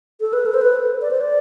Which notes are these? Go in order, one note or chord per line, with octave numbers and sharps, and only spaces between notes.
A4
B4
A4
C5
B4
D5
C5
D5